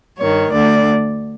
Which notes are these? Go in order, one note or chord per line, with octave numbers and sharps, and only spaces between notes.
G2 D#3 C#5
D2 D3 D5